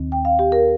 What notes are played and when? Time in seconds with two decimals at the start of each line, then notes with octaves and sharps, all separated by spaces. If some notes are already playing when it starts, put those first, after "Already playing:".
Already playing: D#2 D#3 C4
0.12 G5
0.25 F5
0.39 G4
0.52 A#4